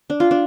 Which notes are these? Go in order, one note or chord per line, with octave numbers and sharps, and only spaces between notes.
D4
F4
D4